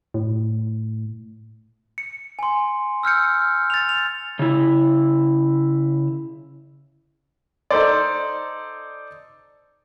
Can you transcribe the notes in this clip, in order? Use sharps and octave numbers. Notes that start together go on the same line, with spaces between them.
A2
C#7
G#5 C6
E6 F6 G6 C#7
A6 F7
F7
C#3 E4
D#4 A4 C5 D5